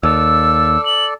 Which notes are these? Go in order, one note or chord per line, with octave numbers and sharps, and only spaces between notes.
D#2 A4 D5 E6
F#7